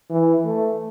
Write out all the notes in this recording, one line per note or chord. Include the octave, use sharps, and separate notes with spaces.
E3
A3